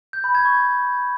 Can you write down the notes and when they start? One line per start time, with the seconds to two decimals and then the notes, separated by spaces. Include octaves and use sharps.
0.13 G6
0.24 B5
0.35 G#6
0.45 C#6